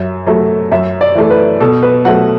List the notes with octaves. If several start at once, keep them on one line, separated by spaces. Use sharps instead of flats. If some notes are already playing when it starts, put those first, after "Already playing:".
Already playing: F#2 E5
F#3 A3
F#2 E5
D5
E3 A3
B4
B2 A4
B4
F#3 A3 F#5